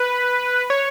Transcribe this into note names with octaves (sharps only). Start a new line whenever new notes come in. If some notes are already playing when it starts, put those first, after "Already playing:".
Already playing: B4
C#5